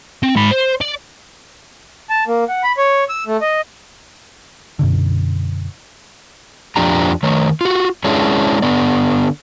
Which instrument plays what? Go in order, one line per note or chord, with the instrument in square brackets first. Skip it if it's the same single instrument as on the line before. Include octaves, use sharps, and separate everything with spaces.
[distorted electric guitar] C4
G#2 B5
C5
D5
[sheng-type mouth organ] A5
A#3
F#5
B5
C#5
E6
A3
D#5
[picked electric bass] F#2 B2 D3
[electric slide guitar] F2 F3 D4 G4 A#5
D#3 A3 C#5
F4 F#4
G#3 C#4 D4 E4 G#4 C#5
D3 B3 D5